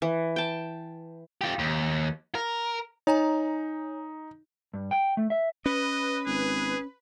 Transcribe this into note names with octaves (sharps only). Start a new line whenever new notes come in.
E3
G5 A5
F4 G4
D#2
A#4
D#4 C#5 G#5 A#5
G2
G5
A3
E5
C#4 B4 D#5
G#1 G#4